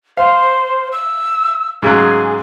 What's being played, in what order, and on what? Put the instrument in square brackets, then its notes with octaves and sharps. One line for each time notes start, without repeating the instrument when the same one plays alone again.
[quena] C5 [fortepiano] F5
[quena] E6
[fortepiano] G#2 C#3 F#3 [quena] G#4